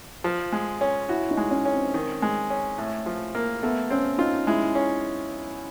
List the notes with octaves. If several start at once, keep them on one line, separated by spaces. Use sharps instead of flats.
F3
G#3
C#4
E4 F#4
D#4
G#3
C#4
C#4
C4
D#3
G#3
C#4
A2
F3
A#3
A3 B3
C4 C#4
D#4 F4
G#3 E4
C#4